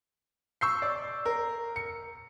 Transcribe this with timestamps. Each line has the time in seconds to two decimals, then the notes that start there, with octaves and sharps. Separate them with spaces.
0.61 C#6 E6 G6 C7
0.82 D5
1.25 A#4
1.76 C#7